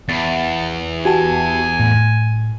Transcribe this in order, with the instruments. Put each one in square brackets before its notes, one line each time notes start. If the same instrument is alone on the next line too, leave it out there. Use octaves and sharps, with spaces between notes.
[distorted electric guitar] E2 [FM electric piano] A6
[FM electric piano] F#4 G4 A5 [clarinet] G#5
[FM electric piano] A2